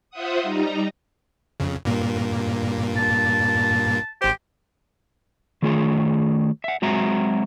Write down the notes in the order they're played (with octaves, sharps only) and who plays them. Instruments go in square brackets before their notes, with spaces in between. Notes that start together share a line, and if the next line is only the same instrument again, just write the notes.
[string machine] F4 C5 E5 F#5 D#6
G3 D#4 A#5
[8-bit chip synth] F2 C#3
G2 A#2 A#3
[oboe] A5
[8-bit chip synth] G#1 C5 [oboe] G4
[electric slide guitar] D#3 A3 F4 G#4 C#5
E5 F#5
F#3 G#3 C4 F#4 E5 A#5